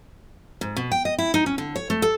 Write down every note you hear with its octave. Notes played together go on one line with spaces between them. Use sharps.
G#2
B2
G5
D#5
E4
D#4
C#4
D3
C#5
A3
A4